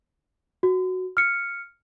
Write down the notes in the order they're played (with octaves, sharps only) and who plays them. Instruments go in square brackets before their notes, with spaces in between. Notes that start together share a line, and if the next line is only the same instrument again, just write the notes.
[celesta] F#4
F6 C#7